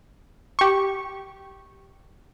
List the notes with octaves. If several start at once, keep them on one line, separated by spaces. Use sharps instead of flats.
G4 C#6